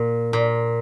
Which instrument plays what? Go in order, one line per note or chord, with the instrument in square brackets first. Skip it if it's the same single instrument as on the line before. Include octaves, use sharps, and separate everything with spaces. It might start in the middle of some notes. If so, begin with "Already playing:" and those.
Already playing: [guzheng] A#2
A#2